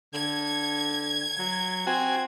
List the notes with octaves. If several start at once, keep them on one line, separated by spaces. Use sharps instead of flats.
D3 G#6
F#3
C4 F#4 G#5